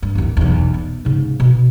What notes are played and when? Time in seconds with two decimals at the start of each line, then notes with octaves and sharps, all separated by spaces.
0.02 G2
0.15 A1 D#2
0.37 B1 E2
0.74 B3
1.05 G#2 C#3
1.40 B2